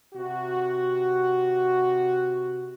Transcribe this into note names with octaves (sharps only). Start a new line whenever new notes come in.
C3 F#4